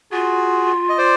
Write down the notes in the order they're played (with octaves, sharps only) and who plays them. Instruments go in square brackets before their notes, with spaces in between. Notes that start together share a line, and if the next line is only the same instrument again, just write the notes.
[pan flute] F4 [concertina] F#4 G#4
[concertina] D#5
C5 D5